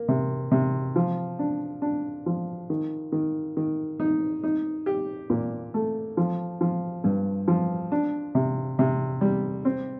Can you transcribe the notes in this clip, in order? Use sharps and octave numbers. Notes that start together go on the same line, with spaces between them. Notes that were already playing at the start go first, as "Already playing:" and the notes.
Already playing: A#3
C3
C3
F3
D4
D4
F3
D#3
D#3
D#3
D#4
D#4
G4
A#2
A3
F3
F3
G2
F3
D4
C3
C3
G3
C4